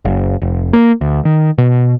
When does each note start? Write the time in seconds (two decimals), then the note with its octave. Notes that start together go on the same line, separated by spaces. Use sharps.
0.05 F#1
0.42 F1
0.73 A#3
1.01 D2
1.25 D#3
1.58 B2